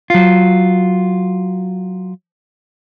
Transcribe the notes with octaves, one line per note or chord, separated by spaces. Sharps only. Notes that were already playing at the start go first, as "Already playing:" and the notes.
F#3 F4